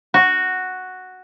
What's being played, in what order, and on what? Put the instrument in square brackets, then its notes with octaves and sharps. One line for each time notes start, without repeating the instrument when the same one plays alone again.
[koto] F#4